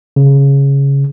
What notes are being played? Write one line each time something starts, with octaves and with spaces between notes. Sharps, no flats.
C#3